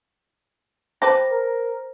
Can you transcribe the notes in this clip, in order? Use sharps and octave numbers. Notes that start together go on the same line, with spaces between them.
G4 A4 B4 C5 A#6
A#4